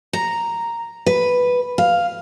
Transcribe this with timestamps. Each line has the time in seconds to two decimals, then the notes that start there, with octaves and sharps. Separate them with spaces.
0.13 A#5
1.06 B4
1.78 F5